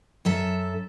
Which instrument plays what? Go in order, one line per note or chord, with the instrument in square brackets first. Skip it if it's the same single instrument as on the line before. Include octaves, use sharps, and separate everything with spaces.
[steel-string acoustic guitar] F#2 A4 E5